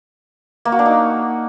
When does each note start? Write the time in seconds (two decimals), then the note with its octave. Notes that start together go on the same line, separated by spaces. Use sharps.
0.65 A#3
0.72 F#4
0.79 D4
0.86 D#4